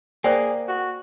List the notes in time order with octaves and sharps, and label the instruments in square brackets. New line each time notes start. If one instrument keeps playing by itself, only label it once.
[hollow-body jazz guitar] A#3 [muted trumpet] G#4 [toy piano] C5 D5 G5
[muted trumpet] F#4